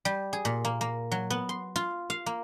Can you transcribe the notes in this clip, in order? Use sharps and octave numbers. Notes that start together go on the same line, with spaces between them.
G3
G#4
A#2
A#3
A#3
F#3
B3
C6
F4
F5
A#3